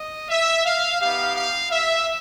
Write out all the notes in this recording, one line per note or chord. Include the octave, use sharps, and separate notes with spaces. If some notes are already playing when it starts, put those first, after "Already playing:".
Already playing: D#5
E5
F5
B3 D#4 G4 F5
F5
E5